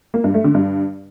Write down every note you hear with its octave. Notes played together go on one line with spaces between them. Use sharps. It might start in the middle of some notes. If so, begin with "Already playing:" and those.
A#3
G2
A3
D3
G2